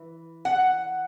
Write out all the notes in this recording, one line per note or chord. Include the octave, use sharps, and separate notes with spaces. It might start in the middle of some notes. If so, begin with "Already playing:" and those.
Already playing: E3
F#5